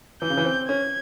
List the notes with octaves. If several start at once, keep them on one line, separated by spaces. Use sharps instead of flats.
E3 G6
C#3
E3
C4
C#4 G#6